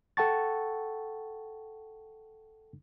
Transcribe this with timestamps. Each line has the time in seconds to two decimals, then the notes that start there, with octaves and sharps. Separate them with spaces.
0.17 A4 F#5 G5 A5 C#6 A6